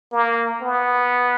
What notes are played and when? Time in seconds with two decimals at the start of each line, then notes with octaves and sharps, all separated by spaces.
0.12 A#3
0.62 B3